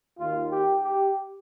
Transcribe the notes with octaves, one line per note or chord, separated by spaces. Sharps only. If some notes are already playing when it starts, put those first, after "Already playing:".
D#2 D#3 F4
G4
G4